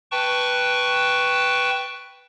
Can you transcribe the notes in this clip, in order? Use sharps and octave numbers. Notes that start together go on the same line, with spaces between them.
B4 G5 A5 C#6